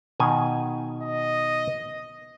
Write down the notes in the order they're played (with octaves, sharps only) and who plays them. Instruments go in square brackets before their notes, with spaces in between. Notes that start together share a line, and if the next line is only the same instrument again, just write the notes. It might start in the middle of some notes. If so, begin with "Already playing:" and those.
[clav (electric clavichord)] B2 D#3 G#5
[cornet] D#5